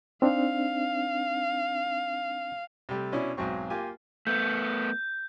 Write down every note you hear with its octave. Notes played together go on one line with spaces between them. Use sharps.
C4 D4 D#4 F5
C3 G3 A3
B2 C#4 D4 E4
B1 G#2 F#3 C4 C#6
A#3 F4 G4 G#5
A3 B3 G6